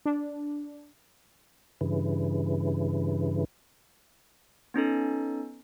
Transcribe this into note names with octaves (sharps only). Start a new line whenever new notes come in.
D4
G2 C#3 E3
B3 C#4 D#4 A4